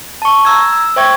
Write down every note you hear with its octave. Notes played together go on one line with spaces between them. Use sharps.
A5 C#6
A#5 E6 G#6
E6
C5 E5 G5 C#6 G#6